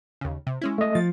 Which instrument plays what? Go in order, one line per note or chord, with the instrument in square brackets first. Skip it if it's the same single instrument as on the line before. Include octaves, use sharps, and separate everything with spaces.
[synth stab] D#2 C#3
C3
G#3 C#4 E4
[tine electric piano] A3 D#5
[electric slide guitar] F3 [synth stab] A6